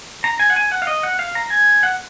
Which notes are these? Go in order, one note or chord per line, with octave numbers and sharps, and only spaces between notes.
A#5
G#5
F#5
G#5
F#5
F5
D#5
F#5
F5
A#5
G#5
F#5